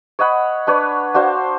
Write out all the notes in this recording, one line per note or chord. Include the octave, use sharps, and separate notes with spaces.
C#5 D#5 F#5 B5
D4 B4 C#5
D4 F#4 C5 F5